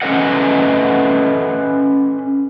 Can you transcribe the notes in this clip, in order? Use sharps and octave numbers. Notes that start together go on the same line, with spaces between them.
C#4 D#4 A4 B4 D#5 F#5